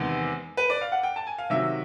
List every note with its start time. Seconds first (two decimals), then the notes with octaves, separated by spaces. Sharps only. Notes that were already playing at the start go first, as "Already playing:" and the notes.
Already playing: E2 C3 D#3 G#3 B3
0.57 B4
0.70 D5
0.81 F5
0.92 F#5
1.03 G5
1.16 A5
1.27 G#5
1.38 F5
1.50 C3 D#3 F#3 E5